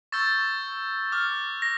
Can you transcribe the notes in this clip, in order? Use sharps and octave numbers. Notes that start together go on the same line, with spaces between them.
C#6 E6 G6 A6
D6 F6
A#6